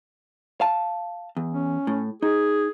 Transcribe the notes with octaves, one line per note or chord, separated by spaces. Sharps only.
F5 A5
E2
C#4
A2
D#4 G#4